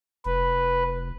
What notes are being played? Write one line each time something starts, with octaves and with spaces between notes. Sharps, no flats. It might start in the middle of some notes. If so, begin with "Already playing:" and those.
F1 B4